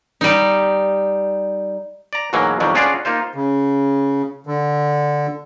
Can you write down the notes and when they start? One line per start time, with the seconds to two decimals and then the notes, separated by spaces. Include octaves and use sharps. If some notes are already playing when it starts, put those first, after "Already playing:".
0.21 G3 D#4
2.13 D5 A#5
2.33 G#2 B2 E3 F#3 A#3
2.60 F2 B2 D#3 F#3 G3
2.75 C#4 D4 F4 F#4 G#4 D5
3.05 A#3 D#4 F4 C5
3.34 C#3
4.47 D3